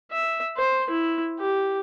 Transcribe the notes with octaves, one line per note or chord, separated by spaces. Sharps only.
E5
C5
E4
G4